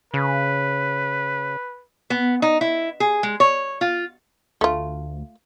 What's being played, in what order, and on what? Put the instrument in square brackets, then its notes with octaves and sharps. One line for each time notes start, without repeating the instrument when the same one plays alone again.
[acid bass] C#3 [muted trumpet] B4
[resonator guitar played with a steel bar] B3
D#4
E4
G#4
G#3
C#5
F4
[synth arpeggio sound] D2 [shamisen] A3 F4